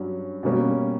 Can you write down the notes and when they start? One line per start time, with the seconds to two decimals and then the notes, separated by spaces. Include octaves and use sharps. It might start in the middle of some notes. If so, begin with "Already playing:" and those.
Already playing: G2 F#3 C#4
0.43 B2 G3 A#3 C#4